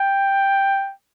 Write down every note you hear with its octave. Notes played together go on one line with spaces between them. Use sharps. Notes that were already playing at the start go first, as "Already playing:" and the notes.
Already playing: G5